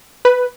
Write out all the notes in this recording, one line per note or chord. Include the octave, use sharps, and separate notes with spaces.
B4